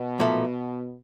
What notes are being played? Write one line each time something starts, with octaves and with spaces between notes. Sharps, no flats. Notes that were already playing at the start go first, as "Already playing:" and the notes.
Already playing: B2
B1 A#2 F3 A3